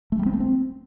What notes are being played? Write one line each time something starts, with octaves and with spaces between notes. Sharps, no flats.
A3
G3
C4
A3
C4